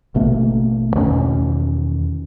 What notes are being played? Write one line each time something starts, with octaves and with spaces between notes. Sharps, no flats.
A1 B2 A3 A#3
E2 B2 D#3 C#4